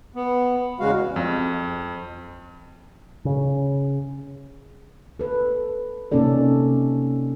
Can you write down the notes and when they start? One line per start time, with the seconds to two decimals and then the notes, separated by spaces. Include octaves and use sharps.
0.15 B3
0.80 E2 C#3 G#3 F#4 F5
1.16 F2
3.25 C#3
5.19 A4 B4
6.12 C3 A#3 C#4 D#4 A4 D5